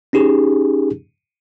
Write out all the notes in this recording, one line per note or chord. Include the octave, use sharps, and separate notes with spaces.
C#4 D#4 G4 G#4